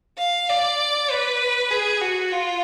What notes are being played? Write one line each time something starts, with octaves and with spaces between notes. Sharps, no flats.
F5
D5
B4
G#4
F#4
F4